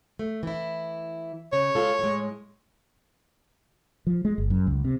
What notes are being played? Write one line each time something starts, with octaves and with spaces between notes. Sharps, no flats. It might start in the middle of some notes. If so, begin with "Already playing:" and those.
A3
E3 E4
C#3 C#5
G#3 F4 A4
A2 G#3
F3
G#3
G1
F#2
C#2
C3